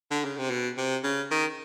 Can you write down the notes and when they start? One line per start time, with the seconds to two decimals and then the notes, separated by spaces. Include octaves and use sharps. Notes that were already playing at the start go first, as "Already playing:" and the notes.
0.11 D3
0.24 C#3
0.38 C3
0.50 B2
0.78 C3
1.03 C#3
1.31 D#3